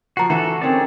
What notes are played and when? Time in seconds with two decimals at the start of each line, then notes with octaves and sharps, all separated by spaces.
0.17 F3 F#4 F#5 A#5 C7
0.30 E3 F#4 A4
0.61 D#3 C4 C#4 G#4 D5